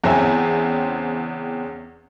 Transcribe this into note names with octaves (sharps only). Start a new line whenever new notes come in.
E2 C#3 C4 C#4 E5 G#5